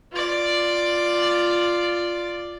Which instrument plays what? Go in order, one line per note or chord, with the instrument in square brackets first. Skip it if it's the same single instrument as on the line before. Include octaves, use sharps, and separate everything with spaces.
[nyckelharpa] F4 D5